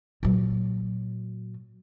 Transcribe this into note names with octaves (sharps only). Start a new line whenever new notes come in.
A#2 F#3